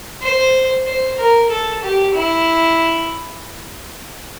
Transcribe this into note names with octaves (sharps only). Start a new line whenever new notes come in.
C5
C5
A#4
A4
G4
E4